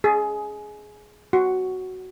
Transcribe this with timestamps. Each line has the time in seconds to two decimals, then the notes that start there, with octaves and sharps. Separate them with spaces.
0.04 G#4
1.33 F#4